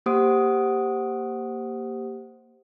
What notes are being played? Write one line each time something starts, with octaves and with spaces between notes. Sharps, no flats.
A#3 G4 C5 F#5 D#6 D7